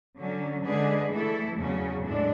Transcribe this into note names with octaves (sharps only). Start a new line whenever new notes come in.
D3 F#3 C#4
D3 G#3 D4 G#4 B4
E3 A3 E4 A4
E2 C#3 F#3 C#4
A2 G#3 D4